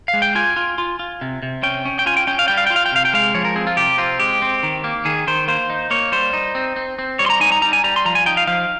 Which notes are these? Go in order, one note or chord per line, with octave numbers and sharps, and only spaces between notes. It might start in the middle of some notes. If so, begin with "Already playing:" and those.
F5
G#3
G5
F4 G#5
F4
F4
F4
C3
C3
C#4 G5
C#4
G5
F4 G#5
G5
C#4 G5
F5
G3 G5
F5
F4 G5
F5
G5
C3 F5
G5
G#3 F5
F3 C#5
A#4
C4 G#4
F4
C3 G4
C4 F4
G#3 G4
C4
D#3
A#3
D#3 G#4
D#3 C5
A#3 C5
D#4
A#3 C#5
G3 C5
D#4
C4
C4
C4
G3 C#5
C6
A#5
D#4 G#5
A#5
G3 A#5
G#5
G3 A#5
C6
F3 A#5
G#5
D#4 G5
F5
F3 F5